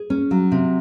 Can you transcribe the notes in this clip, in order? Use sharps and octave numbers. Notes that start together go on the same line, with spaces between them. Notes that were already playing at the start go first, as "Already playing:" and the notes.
Already playing: G#4
C#4
F#3
C3